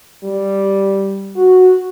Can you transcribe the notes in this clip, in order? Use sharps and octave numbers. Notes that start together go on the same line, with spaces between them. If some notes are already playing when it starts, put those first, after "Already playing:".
G3
F#4